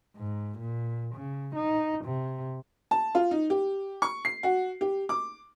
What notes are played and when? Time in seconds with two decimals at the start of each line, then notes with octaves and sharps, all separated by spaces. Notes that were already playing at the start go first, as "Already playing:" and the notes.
0.17 G#2
0.58 A#2
1.15 C#3
1.56 D#4
2.05 C3
2.91 A5
3.15 F4
3.31 D#4
3.50 G4
4.02 C#6
4.25 C7
4.43 F#4
4.81 G4
5.09 D6